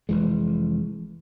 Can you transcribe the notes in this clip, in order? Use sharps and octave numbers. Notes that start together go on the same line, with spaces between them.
F1 E2 E3 G#3